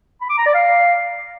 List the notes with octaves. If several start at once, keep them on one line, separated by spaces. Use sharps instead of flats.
B5
D6
A#5
D5
F5